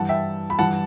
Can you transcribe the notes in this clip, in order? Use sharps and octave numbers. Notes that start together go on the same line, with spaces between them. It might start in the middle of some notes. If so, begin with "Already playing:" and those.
Already playing: G2 E3 F#5 A5
E5 G5
B5
G2 E3 F#5 A5